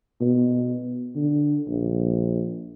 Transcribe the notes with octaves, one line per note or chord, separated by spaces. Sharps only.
B2
D3
A#1